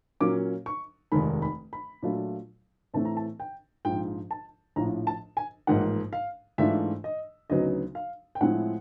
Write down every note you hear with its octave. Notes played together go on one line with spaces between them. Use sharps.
A#2 F#3 A#3 C#4 D6
C#6
F1 D#2 D#3 G#3 B5
B5
B5
A#2 F#3 A3 D4 F4
A2 E3 A3 C4 A5
A#5
A5
G5
A#1 G#2 F3 G5
A5
A#1 A2 F3 A#5
A5
G#5
A1 G#2 F3 A#3 D#4 F#5
F5
G#2 E3 A3 D4 F4 E5
D#5
D2 C#3 F#3 B3 D#4 D#5
F5
G5
A2 F3 G#3 C4 E4 F#5